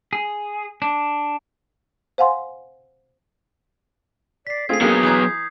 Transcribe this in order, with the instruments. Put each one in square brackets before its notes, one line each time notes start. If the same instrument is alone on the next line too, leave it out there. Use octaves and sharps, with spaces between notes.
[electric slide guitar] G#4
D4
[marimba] C5 F5 F#5 G#5 C6
[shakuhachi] D5 [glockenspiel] B6 C7
[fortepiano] A3 C4 F4 [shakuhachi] G#4 [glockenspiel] G#6 C7
[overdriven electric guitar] F#3 B3 [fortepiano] A#3 G4 A#4 [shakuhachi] G#4
[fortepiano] E3 A#5 [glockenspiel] D#6 G6 G#6